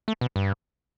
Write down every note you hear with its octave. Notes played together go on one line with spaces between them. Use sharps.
A3
B2
G2